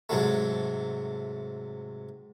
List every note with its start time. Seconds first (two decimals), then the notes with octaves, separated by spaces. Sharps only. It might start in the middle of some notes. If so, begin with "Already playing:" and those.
0.09 G#2 C3 F#3 A3